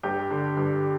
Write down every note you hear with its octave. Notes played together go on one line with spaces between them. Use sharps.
G2 G4
D3
G2